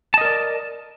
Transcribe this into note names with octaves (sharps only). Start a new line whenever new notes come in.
A#4 D5 D#5 A5